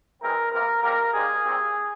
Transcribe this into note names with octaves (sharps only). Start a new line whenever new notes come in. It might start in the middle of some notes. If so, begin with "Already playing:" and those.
E2 E3 G#3 C4 A#4
C3 E3 A#3 A#4
G#2 G3 A#3 A#4
G#2 G3 A#3 G#4
A#2 G3 C4